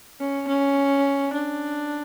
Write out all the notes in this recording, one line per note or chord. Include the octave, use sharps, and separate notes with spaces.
C#4
C#4
D4